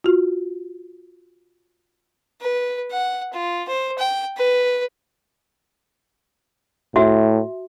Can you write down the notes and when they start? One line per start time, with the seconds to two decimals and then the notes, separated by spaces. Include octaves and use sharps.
0.04 F4 F#4
2.41 B4
2.91 F#5
3.33 F4
3.69 C5
3.99 G5
4.37 B4
6.96 A2 F#4 E5